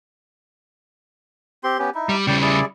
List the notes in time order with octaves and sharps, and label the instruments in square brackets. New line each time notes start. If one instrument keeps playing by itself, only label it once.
[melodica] C4 G4 C6
B3 C#4 G4
D#4 E4
[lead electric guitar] G3
[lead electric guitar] C#3 G3 [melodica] D5 G5
[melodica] E4 G#4 D5